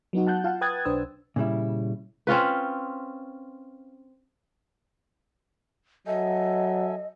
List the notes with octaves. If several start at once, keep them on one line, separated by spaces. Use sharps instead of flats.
F#3 B3 D#4 F#4
F#5 A5 F#6 G6
F4 F5 F#5 A5
B4 G5 D#6 F#6 G#6 A6
B1 D4 B4 C5 E6
A#2 C#3 G3 E4
C4 C#4 F4 B4
F#3 A4 D#5 E5 G#5